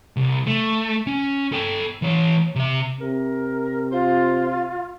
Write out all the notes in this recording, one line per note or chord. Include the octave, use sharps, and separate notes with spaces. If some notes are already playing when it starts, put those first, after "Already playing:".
C2
A3
C#4
A4 G5
E3 C#5
C3 E5
C3 A#4
F4 C5